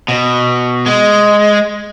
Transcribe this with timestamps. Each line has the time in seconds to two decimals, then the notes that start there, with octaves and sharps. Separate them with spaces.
0.08 B2
0.86 G#3